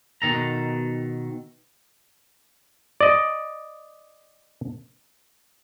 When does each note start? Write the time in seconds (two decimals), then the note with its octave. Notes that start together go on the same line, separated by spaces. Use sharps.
0.22 B2 D#3 A4 A#5
3.01 D5 D#5